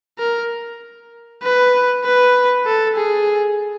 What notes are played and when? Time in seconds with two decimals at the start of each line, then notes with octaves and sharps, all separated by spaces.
0.19 A#4
1.43 B4
2.04 B4
2.66 A4
2.96 G#4